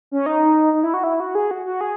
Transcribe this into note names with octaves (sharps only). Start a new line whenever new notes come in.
C#4
D#4
D#4
E4
F#4
E4
F#4
G#4
F#4
F#4
G#4